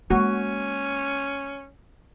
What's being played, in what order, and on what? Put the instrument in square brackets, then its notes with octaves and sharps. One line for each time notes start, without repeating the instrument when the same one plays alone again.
[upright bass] G#3 A#3 [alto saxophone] C#4 [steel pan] F#4